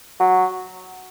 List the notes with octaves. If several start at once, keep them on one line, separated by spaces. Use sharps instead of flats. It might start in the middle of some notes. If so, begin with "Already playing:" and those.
F#3